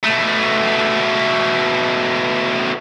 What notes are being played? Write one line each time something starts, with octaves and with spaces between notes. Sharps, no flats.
B2 A3